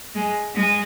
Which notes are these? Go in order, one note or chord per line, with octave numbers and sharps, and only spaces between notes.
G#3
G#3